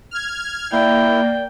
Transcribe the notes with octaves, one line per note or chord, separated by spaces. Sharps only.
F6 G#6
A#3 E4 D5 G5